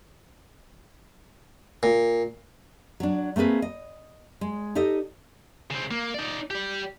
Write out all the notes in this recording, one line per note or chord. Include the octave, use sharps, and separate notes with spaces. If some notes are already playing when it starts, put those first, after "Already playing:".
A#2
F#3 D4
A3 A#3 C4 G#4 B4
D#5
G#3
D#4 G4 A4 D#5
C#3 C4
A#3
D#4 D5
G4 D5